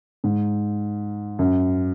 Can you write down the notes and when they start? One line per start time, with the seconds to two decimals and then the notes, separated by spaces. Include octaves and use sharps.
0.24 G#2
1.39 F#2